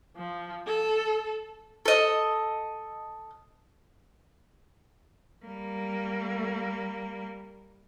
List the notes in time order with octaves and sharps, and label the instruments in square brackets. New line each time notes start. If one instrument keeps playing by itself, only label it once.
[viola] F3
A4
[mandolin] A4 D#5
[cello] G3 A#3